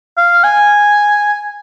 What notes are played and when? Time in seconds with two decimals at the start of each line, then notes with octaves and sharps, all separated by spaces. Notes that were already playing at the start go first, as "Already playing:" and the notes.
0.17 F5
0.44 G#5